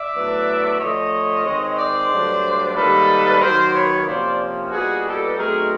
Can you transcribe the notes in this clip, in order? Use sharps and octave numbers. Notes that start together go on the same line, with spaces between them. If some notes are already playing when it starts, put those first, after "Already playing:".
Already playing: D5 E5
A2 F#3 B3 D4
D3 F3 A3 C#5 D#5
D#3 G#3 C4
C5 D5
G2 D3 F#3 A3 D4
G#2 D#3 G3 A#3 D#4 A4 B4
D#3 F#3 A#3 A#4 C5
B4 C#5
C3 F3 A#3 C#4 C5 D5
A#2 G3 B3 D#4 F#4 G#4
G4 A4
B2 F#3 A3 C4 D#4 G#4 A#4